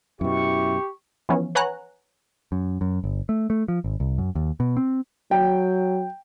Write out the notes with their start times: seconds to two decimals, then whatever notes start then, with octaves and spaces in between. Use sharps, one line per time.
0.21 F#2 B2 E4 G4 C#6
1.29 E3 F3 B3 C#4
1.55 B4 C#5 F#5 G#5 A#5 F#6
2.52 F#2
2.81 F#2
3.04 G1
3.29 A3
3.50 A3
3.68 F3
3.84 G#1
4.00 C2
4.18 F#2
4.35 D#2
4.60 B2
4.77 C4
5.31 F#3 G5